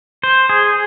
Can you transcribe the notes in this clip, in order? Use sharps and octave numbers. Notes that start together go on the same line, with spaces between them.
C5
G#4